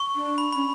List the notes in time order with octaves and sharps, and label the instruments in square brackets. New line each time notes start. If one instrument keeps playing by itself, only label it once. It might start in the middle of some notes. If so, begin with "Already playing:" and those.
Already playing: [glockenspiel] C#6
[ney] D4
[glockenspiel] B5
[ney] C#4 [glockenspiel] B5